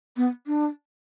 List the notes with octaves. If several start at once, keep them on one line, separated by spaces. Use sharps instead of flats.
B3
D4